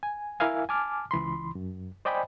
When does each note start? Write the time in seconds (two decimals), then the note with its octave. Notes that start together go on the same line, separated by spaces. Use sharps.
0.03 G#5
0.40 E4 A#4 E5 F5 G#5
0.69 G#5 A5 D6 F6
1.11 C#2 E3 B5 C6
1.55 F#2
2.05 C5 D5 D#5 G5 G#5 B5